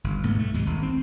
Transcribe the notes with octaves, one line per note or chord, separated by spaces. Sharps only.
G1
B1 G#2 A3 B3
A3
D#2 G#2 C3 G#3
G#1
C4